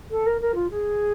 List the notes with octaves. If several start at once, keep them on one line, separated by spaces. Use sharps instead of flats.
A4
A#4
A#4
F4
G#4